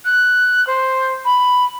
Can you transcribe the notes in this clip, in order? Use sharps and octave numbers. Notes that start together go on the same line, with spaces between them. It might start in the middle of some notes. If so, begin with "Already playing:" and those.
F#6
C5
B5